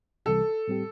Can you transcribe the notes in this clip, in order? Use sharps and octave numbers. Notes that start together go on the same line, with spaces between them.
C2 C3 E3 G3 A4
A2 G3 C4 G4